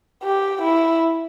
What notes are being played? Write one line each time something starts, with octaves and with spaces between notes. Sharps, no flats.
G4
E4